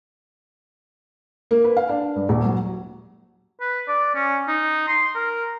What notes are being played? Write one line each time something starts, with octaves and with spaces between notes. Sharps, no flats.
A#3
B4
F5
D4
G2
D#1
F#3
B4
D5
C#4
D#4
C6
A#4